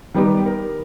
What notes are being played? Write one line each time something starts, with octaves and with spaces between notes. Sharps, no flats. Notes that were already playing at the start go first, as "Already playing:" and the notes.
D#3 G3 B3 D#4 G4
A#4